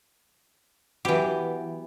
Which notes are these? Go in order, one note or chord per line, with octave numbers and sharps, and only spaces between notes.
E3 F#3 B3 G4